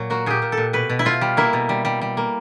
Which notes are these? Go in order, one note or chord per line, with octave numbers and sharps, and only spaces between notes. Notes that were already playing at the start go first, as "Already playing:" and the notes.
Already playing: A#2 F#3
A#3 F#4
A#2 G4 G#4
A#2
A4
A#2
B2 B4
B2
E4
B2 F4
G3
A#3 E4
B2
G3
G3
G3
A#3